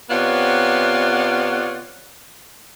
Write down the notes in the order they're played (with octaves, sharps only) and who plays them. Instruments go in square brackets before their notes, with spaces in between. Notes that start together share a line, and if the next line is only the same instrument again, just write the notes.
[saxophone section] C3 B3 F4 C#5 D5 F#5